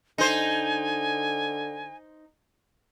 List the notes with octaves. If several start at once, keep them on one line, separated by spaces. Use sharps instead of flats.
D3 D#4 C5 G#5